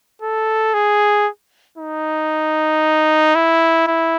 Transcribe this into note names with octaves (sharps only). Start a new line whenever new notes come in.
A4
G#4
D#4
E4
E4